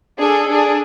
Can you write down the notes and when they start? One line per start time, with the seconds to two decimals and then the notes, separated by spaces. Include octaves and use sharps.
0.19 D4 G#4 A4
0.48 D4 G#4